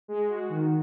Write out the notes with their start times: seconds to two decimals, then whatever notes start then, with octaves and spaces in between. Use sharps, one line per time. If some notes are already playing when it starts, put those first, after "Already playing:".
0.08 G#3
0.29 F#4
0.50 D#3